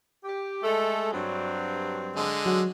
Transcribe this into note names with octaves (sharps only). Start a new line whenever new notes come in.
G4
G#3 A3 A4
G2 F#3 C4
D3 G#3
F#3 F#4